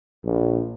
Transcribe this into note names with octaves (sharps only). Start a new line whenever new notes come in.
A#1